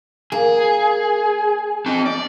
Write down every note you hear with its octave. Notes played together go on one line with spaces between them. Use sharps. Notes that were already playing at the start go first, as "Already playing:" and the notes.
A#3 G#4
C4 A5
D5